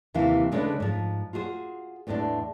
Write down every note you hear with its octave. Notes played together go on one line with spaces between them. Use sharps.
D#2 C3 E3 E4 F5
C#3 G#3 A3 D4 B4
G#2 F3
F4 F#4 G#4 C5
E2 A2 G#3 C#4 D4